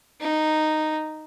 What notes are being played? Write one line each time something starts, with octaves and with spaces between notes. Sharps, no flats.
D#4